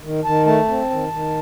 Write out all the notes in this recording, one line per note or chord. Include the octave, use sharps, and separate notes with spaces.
D#3
D#3 A5
A3 A5
C4
D#3
D#3